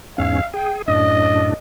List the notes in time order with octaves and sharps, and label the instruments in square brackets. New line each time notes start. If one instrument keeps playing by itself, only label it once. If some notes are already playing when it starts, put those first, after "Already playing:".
[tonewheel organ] E2 G#2 C#4 [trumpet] F5
[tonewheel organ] G#4 [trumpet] G5
[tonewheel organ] F#2 A2 D4 [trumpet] D#5